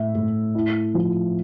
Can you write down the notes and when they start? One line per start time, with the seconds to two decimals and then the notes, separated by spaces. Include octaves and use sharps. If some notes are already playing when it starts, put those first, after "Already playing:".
Already playing: A2 E5
0.15 A2
0.55 E4
0.94 F3